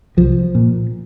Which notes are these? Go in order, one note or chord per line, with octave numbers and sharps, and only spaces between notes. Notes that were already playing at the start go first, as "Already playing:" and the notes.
C2 F3
A#2